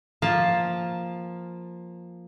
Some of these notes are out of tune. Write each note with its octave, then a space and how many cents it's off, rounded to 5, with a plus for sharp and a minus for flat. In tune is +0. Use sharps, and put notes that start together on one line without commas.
F3 +0 A#3 +0 A5 +0